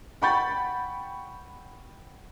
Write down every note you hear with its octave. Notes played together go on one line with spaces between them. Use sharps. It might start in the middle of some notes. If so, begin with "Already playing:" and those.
F#5 G5 B5 C#6 G6 A6